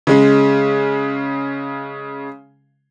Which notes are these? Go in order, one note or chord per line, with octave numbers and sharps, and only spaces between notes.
C#3 G#3 C#4